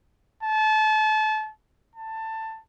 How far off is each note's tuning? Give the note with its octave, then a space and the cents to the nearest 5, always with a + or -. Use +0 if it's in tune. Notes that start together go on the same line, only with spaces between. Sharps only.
A5 -30
A5 +15